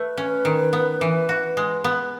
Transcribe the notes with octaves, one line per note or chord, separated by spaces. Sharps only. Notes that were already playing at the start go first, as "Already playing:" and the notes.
Already playing: A3 B4
C#4
D#3
B3
E3
F#4
G#3
B3